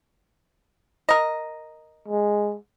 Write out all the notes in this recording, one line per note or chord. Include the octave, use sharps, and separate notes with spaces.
A#4 D#5
G#3